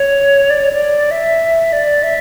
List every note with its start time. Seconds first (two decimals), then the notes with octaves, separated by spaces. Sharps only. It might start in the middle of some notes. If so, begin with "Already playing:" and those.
Already playing: C#5
0.50 D5
0.61 C#5
0.73 D5
1.11 E5
1.73 D5
2.03 E5